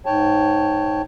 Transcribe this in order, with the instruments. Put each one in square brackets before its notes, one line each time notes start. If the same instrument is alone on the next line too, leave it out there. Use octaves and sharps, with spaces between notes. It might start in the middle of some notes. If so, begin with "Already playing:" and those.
[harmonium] G#2 C#5 G5 A5